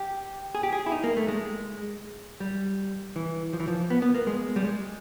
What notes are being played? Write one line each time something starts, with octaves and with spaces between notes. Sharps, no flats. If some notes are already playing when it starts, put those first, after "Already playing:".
Already playing: G4
G#4
G4
G#4
E4
D#4
A#3
A3
G#3
G3
E3
F3
E3
F3
B3
B3
A#3
G#3
G3
G#3